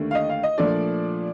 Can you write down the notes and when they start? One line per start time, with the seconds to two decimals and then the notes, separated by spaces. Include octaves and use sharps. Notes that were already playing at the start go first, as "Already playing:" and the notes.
Already playing: D#2 D3 A3
0.11 F5
0.15 D#5
0.29 F5
0.43 D#5
0.58 A#2 F3 A3 D4 D5